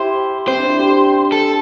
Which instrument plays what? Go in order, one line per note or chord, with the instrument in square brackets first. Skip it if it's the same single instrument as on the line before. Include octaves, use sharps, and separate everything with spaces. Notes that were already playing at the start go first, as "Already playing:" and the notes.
Already playing: [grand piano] E4 G4 [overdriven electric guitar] C5
[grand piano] C4 [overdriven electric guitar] C5
[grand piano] D4
E4
G4
G4
[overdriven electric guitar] A4